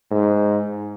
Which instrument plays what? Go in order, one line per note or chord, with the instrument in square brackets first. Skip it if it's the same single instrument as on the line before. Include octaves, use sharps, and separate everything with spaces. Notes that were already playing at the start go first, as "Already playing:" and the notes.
[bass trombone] G#2